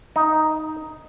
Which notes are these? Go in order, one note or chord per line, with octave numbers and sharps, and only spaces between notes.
D#4